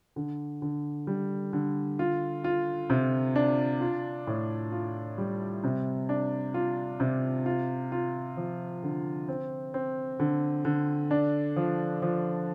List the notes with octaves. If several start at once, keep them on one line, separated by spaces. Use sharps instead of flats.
D3
D3
G3
D3
F4
F4
C3
D4
F4
A2
F4
G3
C3
D4
F4
C3
F4
F4
F3
D3
C4
C4
D3
D3
D4
F3
F3